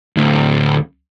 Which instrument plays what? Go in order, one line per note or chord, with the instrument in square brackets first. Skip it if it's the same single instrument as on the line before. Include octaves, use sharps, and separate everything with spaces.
[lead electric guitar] D2 A2